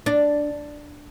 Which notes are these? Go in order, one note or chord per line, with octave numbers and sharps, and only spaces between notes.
D4